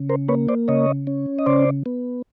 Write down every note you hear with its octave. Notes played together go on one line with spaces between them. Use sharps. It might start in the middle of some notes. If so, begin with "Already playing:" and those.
Already playing: C#3
A#4 C5
A#3 B4 C#5
C5 D5
C#3 C#5 D#5
C#4
D#5
C#3 C5 D5
B3